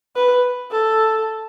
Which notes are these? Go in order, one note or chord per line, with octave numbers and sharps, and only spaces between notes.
B4
A4